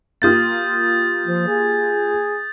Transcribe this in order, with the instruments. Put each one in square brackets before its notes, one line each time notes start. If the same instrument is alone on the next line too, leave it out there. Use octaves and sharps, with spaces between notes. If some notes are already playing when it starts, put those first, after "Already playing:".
[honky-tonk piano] A#3 F4 G4 [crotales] D#6 G6 A6
[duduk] F3
G#4